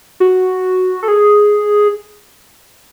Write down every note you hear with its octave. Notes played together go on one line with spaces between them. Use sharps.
F#4
A4
G#4